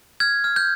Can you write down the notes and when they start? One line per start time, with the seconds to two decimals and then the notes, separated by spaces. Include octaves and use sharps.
0.20 F6 G#6
0.44 F6
0.56 G6